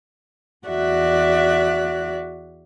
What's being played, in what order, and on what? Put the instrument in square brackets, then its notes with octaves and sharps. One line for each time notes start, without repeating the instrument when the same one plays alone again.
[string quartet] E2 F#4 D5 E5 F#6